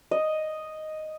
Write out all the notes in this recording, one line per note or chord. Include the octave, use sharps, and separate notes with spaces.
D#5